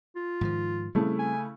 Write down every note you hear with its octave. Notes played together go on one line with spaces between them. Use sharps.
F4
G#2 D#3 F3
C#3 G3 A3 C4 E4
G#5